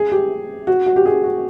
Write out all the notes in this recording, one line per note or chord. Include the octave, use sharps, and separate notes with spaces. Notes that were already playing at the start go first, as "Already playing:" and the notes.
Already playing: G#4
G4
F#4
F#4
G4
G#4
F#4